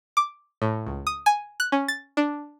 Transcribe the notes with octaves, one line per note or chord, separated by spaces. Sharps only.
D6
A2
C#2
D#6
G#5
F#6
C#4
A6
D4